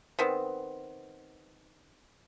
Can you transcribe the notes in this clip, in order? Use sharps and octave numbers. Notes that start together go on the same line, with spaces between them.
D#3 B3 C4